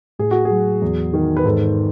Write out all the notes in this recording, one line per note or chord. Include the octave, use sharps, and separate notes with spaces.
A2 G#4
F#4
G#4
F#3
E2
D#3
B4
G#2 A4